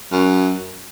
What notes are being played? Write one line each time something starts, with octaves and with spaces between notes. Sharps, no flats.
F#2